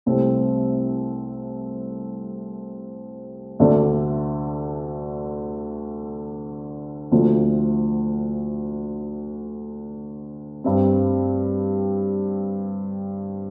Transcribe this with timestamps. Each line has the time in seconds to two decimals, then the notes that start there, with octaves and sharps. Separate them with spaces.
0.06 C2 C3 A3 C4
3.59 D2 D3 A3 D4
7.12 D2 D3 F3 A3
10.64 G2 G3 C4